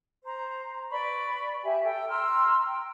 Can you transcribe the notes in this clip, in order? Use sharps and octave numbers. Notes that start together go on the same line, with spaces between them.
C5 A#5
B4 D5 B5 C#6
G4 E5 G#5
A4 G5
A#5 C6 E6 F6
G5